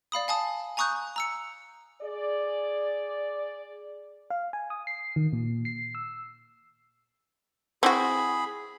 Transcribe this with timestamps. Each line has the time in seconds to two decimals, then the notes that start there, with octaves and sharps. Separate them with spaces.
0.12 D5 F5 B5 D#6
0.28 F5 G#5 A5 D#6
0.77 G#5 A#5 C#6 D#6 F#6 G6
1.16 A#5 E6 C#7
2.02 G#4 D5
4.30 F5
4.53 G#5
4.70 D#6
4.87 C7
5.16 D#3
5.33 A#2
5.65 C7
5.95 E6
7.83 C4 E4 F#4 G#4 B5